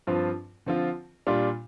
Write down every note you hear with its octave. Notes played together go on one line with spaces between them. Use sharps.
G2 F3 C4 F4
D3 F3 C4 F4
A#2 G3 D4 F4